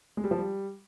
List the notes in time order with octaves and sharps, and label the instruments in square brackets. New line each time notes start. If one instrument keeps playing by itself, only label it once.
[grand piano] G#3
G3
F3
G3